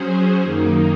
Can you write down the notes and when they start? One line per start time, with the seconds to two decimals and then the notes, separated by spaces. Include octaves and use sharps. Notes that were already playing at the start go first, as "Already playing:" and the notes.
Already playing: F#3 C#4 G#4 C5
0.42 F#2 D#3 A#3 D#4